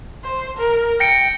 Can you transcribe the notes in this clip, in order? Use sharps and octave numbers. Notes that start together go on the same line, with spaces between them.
C5
A#4
G5 A#6 C#7 D7